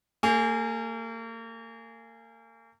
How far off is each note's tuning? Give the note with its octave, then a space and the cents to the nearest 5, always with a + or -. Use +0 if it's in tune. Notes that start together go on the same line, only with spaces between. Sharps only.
A#3 -40 G#4 +0